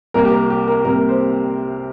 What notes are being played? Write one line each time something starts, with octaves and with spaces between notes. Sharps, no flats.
C2 C3 A#3 A#4
G4
A#4
G4
A#4
C2 C3 A#3 A#4
C5